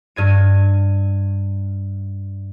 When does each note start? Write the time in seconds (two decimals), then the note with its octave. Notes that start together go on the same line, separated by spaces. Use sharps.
0.16 G2 G#6 D#7